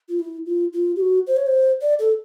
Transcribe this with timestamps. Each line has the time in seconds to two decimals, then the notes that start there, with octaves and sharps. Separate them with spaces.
0.09 F4
0.19 E4
0.46 F4
0.73 F4
0.96 G4
1.00 F#4
1.27 C5
1.37 C#5
1.46 C5
1.81 D5
1.99 A4